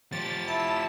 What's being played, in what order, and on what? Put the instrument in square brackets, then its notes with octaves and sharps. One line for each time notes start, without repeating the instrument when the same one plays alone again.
[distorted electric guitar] F3 G4 [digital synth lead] A6
[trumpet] E4 [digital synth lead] A5